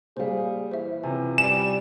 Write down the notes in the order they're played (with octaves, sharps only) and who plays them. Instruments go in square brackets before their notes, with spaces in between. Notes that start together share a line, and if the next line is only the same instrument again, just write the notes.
[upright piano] A#2 G3 [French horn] G#4 [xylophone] C5 C#5 F5
[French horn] E3 [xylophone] C5 E5
[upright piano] C3 F3 C#4 [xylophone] G#5
[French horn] G3 [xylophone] G#5 [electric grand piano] E7